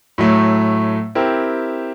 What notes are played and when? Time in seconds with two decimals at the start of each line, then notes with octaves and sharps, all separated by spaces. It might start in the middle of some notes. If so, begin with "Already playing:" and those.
0.18 A2 F#3 A3
1.15 C4 E4 G4 A#4